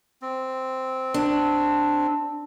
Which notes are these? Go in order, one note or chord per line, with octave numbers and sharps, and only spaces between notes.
C4
D4